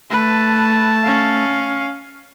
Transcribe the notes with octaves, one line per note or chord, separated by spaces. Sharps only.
A3 B4 A5
C#4 F5